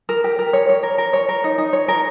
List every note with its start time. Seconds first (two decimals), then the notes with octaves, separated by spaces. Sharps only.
0.09 A#4
0.24 G4
0.39 A#4
0.53 C#5
0.69 C#5
0.83 A#4
0.98 A#4
1.13 C#5
1.29 A#4
1.44 D#4
1.58 D#4
1.73 C#5
1.88 A#4